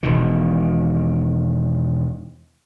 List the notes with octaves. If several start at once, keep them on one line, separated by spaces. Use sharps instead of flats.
E1 B2 D#3